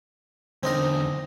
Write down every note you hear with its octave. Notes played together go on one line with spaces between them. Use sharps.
E2 D3 C4 D#4 A#4